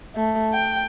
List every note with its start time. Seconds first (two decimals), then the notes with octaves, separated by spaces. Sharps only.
0.16 A3
0.53 G5